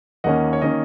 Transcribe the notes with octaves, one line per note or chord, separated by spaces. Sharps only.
D#2 D#3 A#3 C#4 D#5 F#5
C#5
D#3 A#3 C#4 D#5